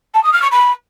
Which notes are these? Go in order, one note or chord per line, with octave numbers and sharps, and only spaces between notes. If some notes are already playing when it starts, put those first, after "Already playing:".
A5
D#6
F6
C#6
B5